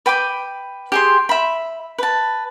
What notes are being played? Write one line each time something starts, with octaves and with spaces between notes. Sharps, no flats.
B4 G5 B5 D6
G4 G#4 C6
E5 B5
B4 A5